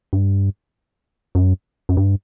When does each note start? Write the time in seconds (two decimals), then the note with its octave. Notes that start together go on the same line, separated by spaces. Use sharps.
0.13 G2
1.35 F#2
1.89 F#2
1.97 G2